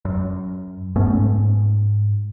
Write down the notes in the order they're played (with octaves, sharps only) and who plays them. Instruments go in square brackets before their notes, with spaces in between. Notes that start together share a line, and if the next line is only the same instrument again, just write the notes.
[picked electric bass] F#2
G2 A3 B3 C#4
G#2